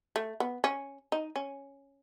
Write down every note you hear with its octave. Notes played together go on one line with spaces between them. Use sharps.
A3
B3
C#4
D#4
C#4